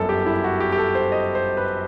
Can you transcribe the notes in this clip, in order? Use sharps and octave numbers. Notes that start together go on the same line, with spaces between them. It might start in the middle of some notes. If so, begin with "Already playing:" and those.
Already playing: G1 F#2 F#3 A4
G4
E4
F#4
G4
G4
A4
C5
D#5
C5
B4